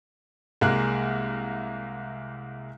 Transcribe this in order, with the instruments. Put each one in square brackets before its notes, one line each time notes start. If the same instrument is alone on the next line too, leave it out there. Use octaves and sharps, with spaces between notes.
[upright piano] C2 G#3 A#3 F5 F#6